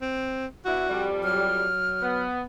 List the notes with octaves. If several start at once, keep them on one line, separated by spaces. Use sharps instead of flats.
C4
B3 D4 E4 F#4
F2 G3
F#3 F6
B3